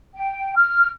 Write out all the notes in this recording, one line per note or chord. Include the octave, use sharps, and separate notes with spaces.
G5
F6